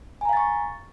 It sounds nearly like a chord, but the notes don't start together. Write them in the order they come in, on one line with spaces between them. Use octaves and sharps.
G#5 A#5 F5 A6 C#6